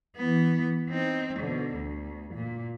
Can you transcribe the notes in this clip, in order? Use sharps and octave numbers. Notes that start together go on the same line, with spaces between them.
E3 B3
C4 D#4
B2 D3
D2
A#2